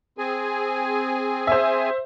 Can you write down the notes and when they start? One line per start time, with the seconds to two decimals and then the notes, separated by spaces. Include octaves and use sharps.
0.18 C4 G#4 G#5
1.47 C5 E5